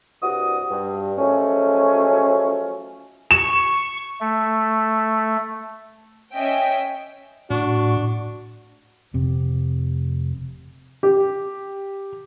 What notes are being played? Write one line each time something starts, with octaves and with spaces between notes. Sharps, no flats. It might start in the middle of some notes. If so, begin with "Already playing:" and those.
C2 G2 F#4 D#6
G2
F3 F#3 G#3 A3 C#4
C#6 E7
A3
C#4 D#5 E5 G5
A2 D4 F#4 C#6
F1 C3
G4